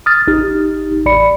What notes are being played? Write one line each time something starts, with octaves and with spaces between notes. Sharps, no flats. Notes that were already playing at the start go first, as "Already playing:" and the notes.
D#6 F6 A6
A1 D#4 G4
A1 D5 B5 C#7